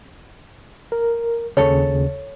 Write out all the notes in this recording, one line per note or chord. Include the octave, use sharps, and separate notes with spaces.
A#4
D#2 C#3 A4 C#5